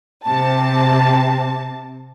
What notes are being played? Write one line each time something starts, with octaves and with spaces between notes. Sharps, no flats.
C3 A5